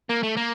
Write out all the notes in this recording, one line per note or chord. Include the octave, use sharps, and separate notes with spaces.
A#3
A3
A#3